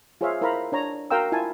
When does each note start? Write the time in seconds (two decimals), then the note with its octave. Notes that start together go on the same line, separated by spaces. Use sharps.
0.21 F4 G#4 C5 C#5 E5 F5
0.41 E4 A#4 C5 F5 A#5 B5
0.72 D4 C#5 A#5
1.11 F#4 A#4 F5 G5 A#5 E6
1.32 E4 F4 G#5 A5